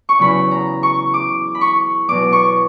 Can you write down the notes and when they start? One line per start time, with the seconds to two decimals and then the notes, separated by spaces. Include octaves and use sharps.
0.09 C#6
0.19 E2 C#3 F#3 B5
0.51 A#5
0.83 C#6
1.14 D6
1.55 B5
1.61 C#6
2.08 E2 B2 F#3 D6
2.32 C#6